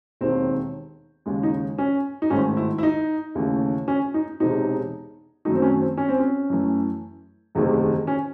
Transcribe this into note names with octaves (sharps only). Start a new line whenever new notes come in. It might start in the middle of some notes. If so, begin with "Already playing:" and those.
E1 D#2 D#3 C4
D#2 C#3 G#3
D#4
C#4
D#4
G#1 G#2 D#3 A3 C#4
E4
E4
D#4
D#2 C#3 E3 A3
C#4
D#4
E1 E2 C3 D#4
F#2 D#3 F#3 A3 D#4
C4
C#4
C4
C#4
C4
C#4
F#2 E3 A3
F#1 E2 C3 D#3 A3
C#4